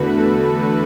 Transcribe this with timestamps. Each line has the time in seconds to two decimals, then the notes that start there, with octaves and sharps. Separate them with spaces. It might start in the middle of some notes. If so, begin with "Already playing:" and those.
Already playing: E2 D3 A3 F#4 B4
0.17 A4